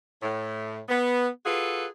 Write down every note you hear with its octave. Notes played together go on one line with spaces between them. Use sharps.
A2
B3
F4 F#4 G#4 A4 B4